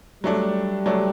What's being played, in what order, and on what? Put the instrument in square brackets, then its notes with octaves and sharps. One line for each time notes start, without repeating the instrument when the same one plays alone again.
[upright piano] F#3 A3 D4 [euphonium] G3
[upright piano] F#3 A3 D4